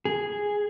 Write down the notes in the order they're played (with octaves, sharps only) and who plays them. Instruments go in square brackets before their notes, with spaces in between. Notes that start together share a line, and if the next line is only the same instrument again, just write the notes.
[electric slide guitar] G#4